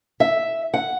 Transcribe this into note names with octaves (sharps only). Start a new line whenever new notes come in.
E5
F#5